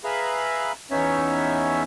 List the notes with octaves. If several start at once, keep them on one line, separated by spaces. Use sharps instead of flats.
G#4 B4 E5 F5 A#5 B5
E2 B3 C#4 D#4 C#5 E5